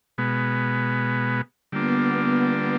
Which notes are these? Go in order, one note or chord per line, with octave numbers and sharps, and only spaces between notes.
B2 G#3 B3
D3 G3 A#3 B3 D4 F4